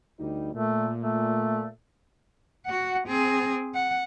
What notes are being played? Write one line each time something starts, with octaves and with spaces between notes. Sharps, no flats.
D2 G3 D#4
A#2 A3
A3
F#4 F#5
C4 G#4
F#5